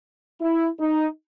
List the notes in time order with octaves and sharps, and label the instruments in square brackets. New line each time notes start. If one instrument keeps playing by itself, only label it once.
[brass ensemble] E4
D#4